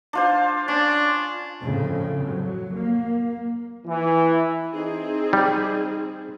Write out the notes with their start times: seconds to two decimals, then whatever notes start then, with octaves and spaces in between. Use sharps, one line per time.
0.13 D4 F4 C5
0.68 C#4 D4
1.62 F2 A2 C#3
2.27 F#3
2.76 A#3
3.86 E3
4.74 C4 D#4 G#4
5.33 G3